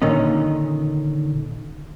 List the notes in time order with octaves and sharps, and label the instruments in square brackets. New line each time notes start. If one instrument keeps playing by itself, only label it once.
[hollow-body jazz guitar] A#2 D3 D#3 C#4 D#4